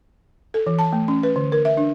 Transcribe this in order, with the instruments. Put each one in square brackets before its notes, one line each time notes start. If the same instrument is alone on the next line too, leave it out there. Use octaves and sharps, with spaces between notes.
[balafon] A4
E3
A5
A3
C#4
B4
D3
A#4
E5
D4